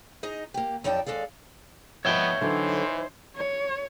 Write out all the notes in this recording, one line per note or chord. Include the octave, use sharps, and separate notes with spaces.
D#4 G#4 D#5 A#5
A#3 G4
F2 F#3 D#4 D5 G5 A5
D#2 G#3 A4 D5 F5
F3 B3 C#5 D#5 E5 G5
D3 E3 F#3 D#4 C5
C#5